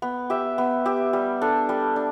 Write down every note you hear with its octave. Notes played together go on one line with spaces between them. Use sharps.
B3
G4 E5
B3
G4 E5
G3
D4 A4
G3
D4